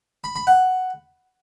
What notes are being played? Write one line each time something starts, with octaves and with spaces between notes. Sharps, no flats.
B5
B5
F#5